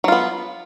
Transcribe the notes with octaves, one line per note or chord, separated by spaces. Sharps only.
F#3 B3 F4